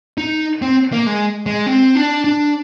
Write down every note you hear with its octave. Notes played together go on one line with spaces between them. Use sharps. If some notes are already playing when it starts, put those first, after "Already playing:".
D#4
C4
A#3
G#3
G#3
C4
D4
D4